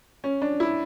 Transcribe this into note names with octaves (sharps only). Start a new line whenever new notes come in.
C#4
D4
E4